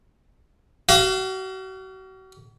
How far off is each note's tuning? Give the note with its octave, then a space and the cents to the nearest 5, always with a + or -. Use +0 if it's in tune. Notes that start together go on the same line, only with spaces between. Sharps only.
F#4 +35 F5 -15